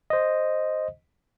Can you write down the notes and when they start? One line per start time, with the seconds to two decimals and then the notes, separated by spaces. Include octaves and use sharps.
0.10 C5 D#5